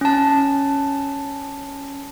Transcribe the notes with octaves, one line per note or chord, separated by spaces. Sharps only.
C#4 A5